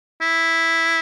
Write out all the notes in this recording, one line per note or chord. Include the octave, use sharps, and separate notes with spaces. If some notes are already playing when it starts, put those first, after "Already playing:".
E4